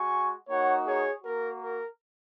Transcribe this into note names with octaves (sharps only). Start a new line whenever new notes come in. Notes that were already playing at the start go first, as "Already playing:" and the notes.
Already playing: G#3 F#4 G#5 C#6
A#3 D#4 F#4 C#5 F#5
G#4 C#5
A#3 F#4 A#4
A#4